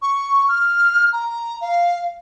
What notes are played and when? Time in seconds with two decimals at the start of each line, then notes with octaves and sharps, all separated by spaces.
0.02 C#6
0.49 F6
1.13 A#5
1.61 F5